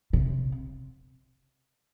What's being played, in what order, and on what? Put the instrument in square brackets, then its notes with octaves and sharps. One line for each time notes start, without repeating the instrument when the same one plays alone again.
[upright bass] C3